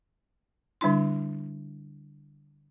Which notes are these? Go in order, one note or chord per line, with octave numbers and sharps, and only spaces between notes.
D3 G3 D4 E4 C6